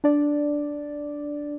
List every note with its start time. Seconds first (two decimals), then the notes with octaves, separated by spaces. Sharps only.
0.04 D4 D5